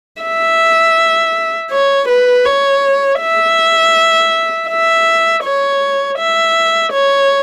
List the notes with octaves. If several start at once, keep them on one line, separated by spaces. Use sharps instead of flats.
E5
C#5
B4
C#5
E5
E5
C#5
E5
C#5